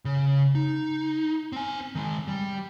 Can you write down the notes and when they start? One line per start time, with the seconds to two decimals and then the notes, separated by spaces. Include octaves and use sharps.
0.05 C#3
0.55 D#4
1.52 C4 G#5
1.95 D#3 G#3
2.28 G3